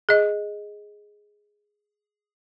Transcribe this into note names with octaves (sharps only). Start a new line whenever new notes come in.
G#4 D#5